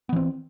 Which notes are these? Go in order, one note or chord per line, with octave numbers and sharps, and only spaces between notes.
E3 B3 C4